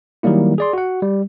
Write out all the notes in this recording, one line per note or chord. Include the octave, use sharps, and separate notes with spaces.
D#3 F#3 G3 A#3 E4
G#4 D5 C6
F#4 F#5
G3